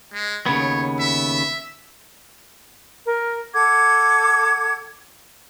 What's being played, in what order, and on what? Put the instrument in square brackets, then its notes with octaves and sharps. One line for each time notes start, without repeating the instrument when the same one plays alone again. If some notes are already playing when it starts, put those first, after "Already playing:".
[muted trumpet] G#3
[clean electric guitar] D#2 C#3 B3 [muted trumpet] C#5
[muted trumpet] E5
[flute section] A#4
A4 F#5 D6 G#6